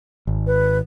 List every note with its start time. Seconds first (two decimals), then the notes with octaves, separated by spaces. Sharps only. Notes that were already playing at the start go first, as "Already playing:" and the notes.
0.27 G#1
0.47 B4